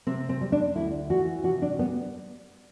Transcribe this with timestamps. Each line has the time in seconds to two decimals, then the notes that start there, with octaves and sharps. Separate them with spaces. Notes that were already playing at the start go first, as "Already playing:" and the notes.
0.07 C3 C4
0.29 C4
0.41 G3
0.52 D4
0.76 D2 E4
1.10 E3 F#4
1.44 C3 F#4
1.62 D4
1.79 G3 B3